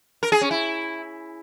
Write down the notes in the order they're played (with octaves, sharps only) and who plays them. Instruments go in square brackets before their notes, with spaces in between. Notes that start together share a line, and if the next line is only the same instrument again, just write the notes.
[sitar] A#4
G#4
C#4
E4